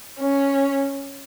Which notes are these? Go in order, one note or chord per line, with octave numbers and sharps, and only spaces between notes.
C#4